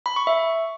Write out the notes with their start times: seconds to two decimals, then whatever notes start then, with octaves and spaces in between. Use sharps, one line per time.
0.06 B5
0.16 C#6
0.27 E5